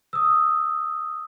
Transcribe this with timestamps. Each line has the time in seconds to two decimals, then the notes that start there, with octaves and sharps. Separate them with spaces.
0.13 D#6 E6